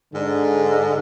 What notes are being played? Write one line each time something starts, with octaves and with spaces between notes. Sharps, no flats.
G#2 D3